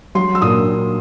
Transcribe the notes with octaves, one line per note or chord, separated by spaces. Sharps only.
F#3 C6
E6
A#2 D#6